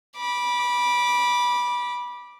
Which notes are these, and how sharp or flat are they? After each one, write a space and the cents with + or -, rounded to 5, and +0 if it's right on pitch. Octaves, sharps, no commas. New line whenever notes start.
B5 -20 D6 +0